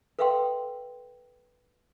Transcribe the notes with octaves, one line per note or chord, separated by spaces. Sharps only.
A4 B4 E5 F5 G5 C6